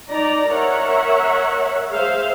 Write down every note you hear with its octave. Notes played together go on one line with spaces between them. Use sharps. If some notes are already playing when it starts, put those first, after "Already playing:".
D#4 D5 A#5
A#4 C#5 E5 F#5
G#4 C5 E5 F5